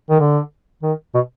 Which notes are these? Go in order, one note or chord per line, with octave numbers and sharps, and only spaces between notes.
D#3
D3
D#3
B2